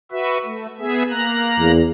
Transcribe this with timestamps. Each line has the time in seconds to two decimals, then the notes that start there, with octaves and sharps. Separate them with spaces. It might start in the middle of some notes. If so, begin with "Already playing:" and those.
0.12 F#4 B4 E5
0.45 A3
0.80 B3 G#4 E5
1.10 A#3 A#5 F#6
1.59 E2